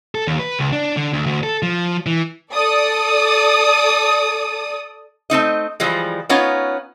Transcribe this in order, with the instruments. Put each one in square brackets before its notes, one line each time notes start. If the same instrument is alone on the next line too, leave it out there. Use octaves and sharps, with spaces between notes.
[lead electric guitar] A4
D#2
B4
C#2
D4
D3
D2
D2
A4
F3
E3
[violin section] A4 D5 D#6
[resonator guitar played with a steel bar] A3 C4 D#4 D#5
E3 F3 G3 G#3
B3 C#4 D#4 F4 C#5